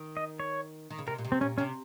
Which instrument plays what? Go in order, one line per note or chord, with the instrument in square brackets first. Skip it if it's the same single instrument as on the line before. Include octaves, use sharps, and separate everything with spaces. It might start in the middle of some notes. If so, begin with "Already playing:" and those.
Already playing: [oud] D#3
[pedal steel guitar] D#5
C#5
[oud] D#3
C#3
[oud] C3 [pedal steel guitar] A#4
[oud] A#2
C3
[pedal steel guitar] C4
[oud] A#2 [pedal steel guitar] C#4
[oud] C3 [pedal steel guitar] C#4